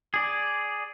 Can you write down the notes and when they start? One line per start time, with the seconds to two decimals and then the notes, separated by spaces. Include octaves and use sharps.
0.14 G#4 D5